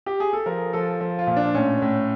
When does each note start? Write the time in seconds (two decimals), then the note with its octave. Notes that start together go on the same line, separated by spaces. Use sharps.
0.06 G4
0.20 G#4
0.33 A4
0.46 F3 A#4
0.73 F3 A4
1.00 F3
1.19 F4
1.27 A#2
1.36 D4
1.54 A2 C#4
1.82 A2